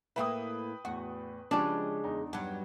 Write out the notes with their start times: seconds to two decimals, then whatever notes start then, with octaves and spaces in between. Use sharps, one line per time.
0.16 A2 A#3 E4 B4 G5 D#6
0.85 E2 A2 F#4
1.51 C#3 F3 G#3 C#4 D4 G4
2.04 E2 D#4
2.33 G2 F#3